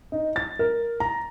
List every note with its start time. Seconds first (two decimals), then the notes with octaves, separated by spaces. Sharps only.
0.12 D#4
0.36 A6
0.59 A#4
1.00 A#5